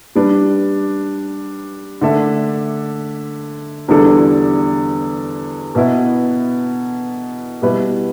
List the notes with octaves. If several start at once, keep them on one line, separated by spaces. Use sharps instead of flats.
G3 D4 B4
D3 A3 D4 A4 E5
E2 D3 G3 D4 A4
B2 B3 E4
B2 G3 E4 B4